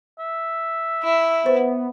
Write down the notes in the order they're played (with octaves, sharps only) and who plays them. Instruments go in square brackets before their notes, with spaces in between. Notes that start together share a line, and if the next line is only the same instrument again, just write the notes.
[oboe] E5
[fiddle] E4
[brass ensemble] B3 [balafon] C5